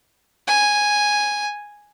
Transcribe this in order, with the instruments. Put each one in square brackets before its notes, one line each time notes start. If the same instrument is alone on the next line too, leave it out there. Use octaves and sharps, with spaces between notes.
[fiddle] G#5